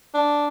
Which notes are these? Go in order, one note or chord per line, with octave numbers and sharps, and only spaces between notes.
D4